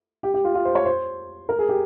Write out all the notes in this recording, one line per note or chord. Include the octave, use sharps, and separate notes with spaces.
G4
G4
F4
F4
C5
C#5
C5
A#4
G#4
G4